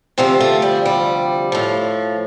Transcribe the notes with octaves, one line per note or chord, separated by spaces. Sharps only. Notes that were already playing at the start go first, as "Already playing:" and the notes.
D2 C3 F3 C4
A3
G3
G3
A2 F3